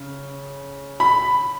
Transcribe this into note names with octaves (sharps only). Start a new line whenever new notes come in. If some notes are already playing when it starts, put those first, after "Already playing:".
Already playing: C#3
B5